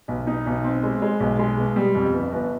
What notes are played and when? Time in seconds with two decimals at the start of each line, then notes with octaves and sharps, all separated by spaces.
0.08 B1
0.27 D#4
0.46 B1
0.64 C4
0.83 G#3
1.02 G#3
1.20 B1
1.39 G#3
1.58 B2
1.76 G3
1.95 F2
2.13 G1
2.32 G1